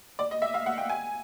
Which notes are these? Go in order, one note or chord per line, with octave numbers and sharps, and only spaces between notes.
D5
D#5
E5
F5
F#5
G5
G#5